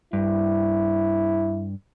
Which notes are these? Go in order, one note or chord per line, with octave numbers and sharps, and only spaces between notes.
G2 E4